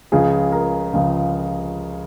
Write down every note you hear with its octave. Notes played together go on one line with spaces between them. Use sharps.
C#2 C#3 F3 G#4
A#4
C#2 C#3 F3